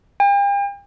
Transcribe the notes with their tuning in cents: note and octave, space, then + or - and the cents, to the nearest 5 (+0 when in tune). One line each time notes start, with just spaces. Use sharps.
G5 +45